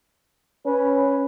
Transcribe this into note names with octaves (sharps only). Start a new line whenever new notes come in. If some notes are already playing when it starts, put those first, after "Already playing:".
C#4 B4 C#5